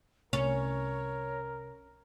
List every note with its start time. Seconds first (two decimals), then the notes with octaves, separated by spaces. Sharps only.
0.33 C2 C#4 A#4 C#5